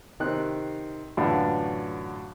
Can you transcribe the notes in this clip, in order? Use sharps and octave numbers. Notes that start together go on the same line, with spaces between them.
C3 D#3 C4 F#6
F#2 A2 D3 E3 D4 F4